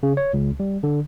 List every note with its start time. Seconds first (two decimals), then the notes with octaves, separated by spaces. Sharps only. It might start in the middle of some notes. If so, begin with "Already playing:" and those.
0.03 C#3
0.17 C#5
0.34 C#2
0.60 G3
0.83 D3